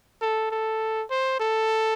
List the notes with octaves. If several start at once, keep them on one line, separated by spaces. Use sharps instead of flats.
A4
A4
C5
A4